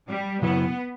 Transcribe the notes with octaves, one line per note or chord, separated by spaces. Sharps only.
G3
F#2 C#3 F#3 B3 E4